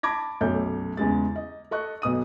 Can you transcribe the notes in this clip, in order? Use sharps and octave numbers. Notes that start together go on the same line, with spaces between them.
A5 B5 D6 G#6 A#6
F1 B1 F#2 A3 C#5 G6
E2 C#3 G#3 A6
D#5
A4 D#5 C#6 F#6
B1 B2 D#6 D#7